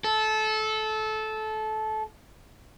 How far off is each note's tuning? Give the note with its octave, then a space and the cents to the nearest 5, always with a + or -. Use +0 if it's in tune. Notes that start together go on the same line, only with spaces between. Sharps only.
A4 -20